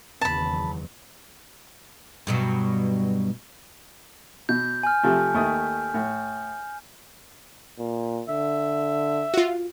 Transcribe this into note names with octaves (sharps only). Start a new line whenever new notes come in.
F#1 E2 D#3 A5 B5
G2 B2 F#3
B2 G6
G#5 F6
C3 F3 A3
D#2 A3 D#6
A2
A#2
D3 E5
F4 F#4